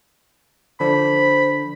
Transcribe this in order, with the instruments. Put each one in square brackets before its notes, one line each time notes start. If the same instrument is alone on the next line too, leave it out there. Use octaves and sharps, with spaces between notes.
[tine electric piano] D3 F3 D4 [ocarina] C5 [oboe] B5